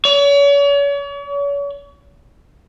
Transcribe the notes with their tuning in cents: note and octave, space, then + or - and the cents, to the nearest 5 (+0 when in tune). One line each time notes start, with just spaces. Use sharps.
C#5 +40